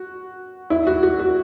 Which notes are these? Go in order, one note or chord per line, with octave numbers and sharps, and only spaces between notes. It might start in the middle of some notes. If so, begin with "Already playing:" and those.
Already playing: F#4
E4
F#4
F#4
F#4